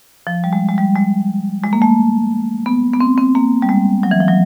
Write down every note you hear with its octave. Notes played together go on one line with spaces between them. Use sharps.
F3
G3
G#3
G#3
G3
G#3
G#3
A#3
A3
B3
B3
C4
C4
A#3
G3
G#3
F#3
E3
F3
F#3